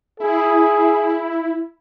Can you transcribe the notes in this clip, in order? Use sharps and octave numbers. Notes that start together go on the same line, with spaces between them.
E4 G#4